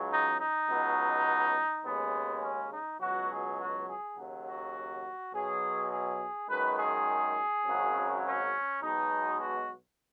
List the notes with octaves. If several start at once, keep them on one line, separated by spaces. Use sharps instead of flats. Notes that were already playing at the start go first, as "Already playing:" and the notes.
Already playing: C#2 C#3 F#3
D#4
D#4
C#2 B2 F#3
D#2 C#3 G#3 B3
C#4
D#4
C#2 B2 F#3 F#4
G#4
F#4
G#4
D#2 C#3 F#3
F#4
B1 B2 F#3 G#4
G#4
F#2 D#3 G#3 B4
G#4
G#1 F#2 C#3 F#3
C#4
B1 B2 G#3 D#4
F#4